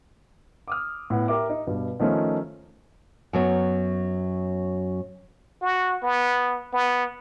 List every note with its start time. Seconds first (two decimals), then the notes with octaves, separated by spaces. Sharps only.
0.68 D6 D#6 F6
1.10 A2 B3 F#5
1.28 G4 A#4 E5 D6
1.50 D#4
1.67 G2 B2
2.00 D#3 F3 A3 C#4 D#4 F4
3.33 F#2 F#3 B3
5.62 F#4
6.03 B3
6.73 B3